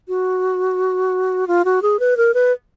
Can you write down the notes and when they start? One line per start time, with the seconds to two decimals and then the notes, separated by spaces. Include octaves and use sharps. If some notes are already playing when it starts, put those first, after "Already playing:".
0.08 F#4
1.47 F4
1.65 F#4
1.82 G#4
1.99 B4
2.17 A#4
2.34 B4